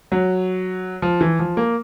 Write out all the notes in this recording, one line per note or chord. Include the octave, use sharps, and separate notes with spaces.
F#3
F3
E3
F3
A#3